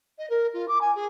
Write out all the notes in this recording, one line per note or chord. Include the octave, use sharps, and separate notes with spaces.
D#5
A#4
F4
D6
G#5
G#4